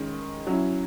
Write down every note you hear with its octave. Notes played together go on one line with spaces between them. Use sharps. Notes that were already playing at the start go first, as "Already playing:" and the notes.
Already playing: D#3 G#3 C#4
F#3 C#4 E4